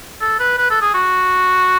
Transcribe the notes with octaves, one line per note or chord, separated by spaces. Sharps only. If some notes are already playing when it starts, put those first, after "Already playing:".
A4
B4
B4
A4
G#4
F#4